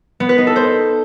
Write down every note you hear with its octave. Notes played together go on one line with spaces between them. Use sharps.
B3
B4
D#4
A4
C5